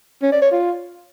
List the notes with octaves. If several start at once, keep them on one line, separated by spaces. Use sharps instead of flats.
C#4
D5
C#5
F4